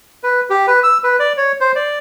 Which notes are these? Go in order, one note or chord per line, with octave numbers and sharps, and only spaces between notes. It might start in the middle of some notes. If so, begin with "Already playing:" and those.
B4
G4
B4
E6
B4
D5
C#5
C5
D5